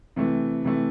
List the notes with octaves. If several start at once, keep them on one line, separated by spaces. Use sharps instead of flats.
C3 E3 A3
C3 E3 A3